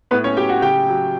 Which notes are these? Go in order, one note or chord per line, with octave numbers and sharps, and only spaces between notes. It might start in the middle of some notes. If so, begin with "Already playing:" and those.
A2 B3 B4
C#4 C#5
F#3 G4 G5
F#4 F#5
C#3 G4 G5
F#3